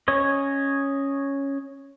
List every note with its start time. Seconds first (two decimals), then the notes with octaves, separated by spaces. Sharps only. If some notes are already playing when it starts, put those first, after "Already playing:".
0.08 C#4 C#5 D#5